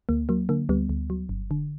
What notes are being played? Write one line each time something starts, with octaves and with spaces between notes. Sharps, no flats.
D2 A#3
F#3 A#3
D3 A#3
D2 G3 B3
D2
F#3
G1
D3